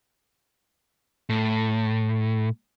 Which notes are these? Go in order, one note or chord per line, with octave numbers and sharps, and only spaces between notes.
A2